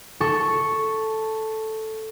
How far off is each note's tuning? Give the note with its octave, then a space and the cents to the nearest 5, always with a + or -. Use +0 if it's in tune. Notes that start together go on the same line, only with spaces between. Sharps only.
A4 +0 C#6 +0